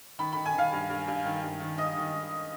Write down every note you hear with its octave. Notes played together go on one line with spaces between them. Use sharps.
D#3 B5
D#3 B5
G#5
D#3 F5
G2
G2
G2
D#3
G2
D#3
D#3 D#5
D#3
D#3